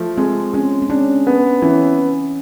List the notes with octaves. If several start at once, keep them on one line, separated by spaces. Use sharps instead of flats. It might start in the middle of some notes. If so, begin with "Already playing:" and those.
Already playing: F3 A3
G#3 C4
G#3 C#4
C4
C#4 D4
B3
E3 C#4